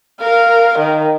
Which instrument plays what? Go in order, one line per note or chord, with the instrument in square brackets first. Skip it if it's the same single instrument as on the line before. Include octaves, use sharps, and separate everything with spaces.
[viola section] A#4 [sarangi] F5
[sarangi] D#3